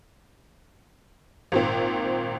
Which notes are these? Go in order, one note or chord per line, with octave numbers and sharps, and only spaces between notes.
G#1 A#2 C4